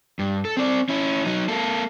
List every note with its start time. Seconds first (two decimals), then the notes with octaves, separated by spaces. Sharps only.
0.19 G2
0.45 A4
0.57 C4 D5
0.89 C#4 E4
1.25 F#3 D#4
1.48 A#3 A4